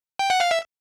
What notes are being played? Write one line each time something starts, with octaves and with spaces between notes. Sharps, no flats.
G5
F#5
F5
E5